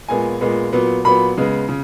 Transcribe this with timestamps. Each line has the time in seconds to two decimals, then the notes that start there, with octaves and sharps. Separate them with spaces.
0.08 A#2 G#3 B3 G#5
0.41 A#2 G#3 B3
0.73 A#2 F#3 B3
1.05 A#2 F#3 B3 B5
1.37 C#3 G#3 B3
1.69 C#3